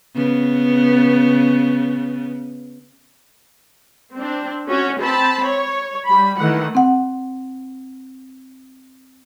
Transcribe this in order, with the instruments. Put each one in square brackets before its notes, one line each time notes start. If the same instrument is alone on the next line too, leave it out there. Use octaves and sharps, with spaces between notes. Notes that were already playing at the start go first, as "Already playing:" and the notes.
[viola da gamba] C#3 B3
[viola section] C4 D4
C#4 F#4 C#5
C4 A5 B5
C#5
G3 B5
D#3 E3 A3 F#5
[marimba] C4 F#5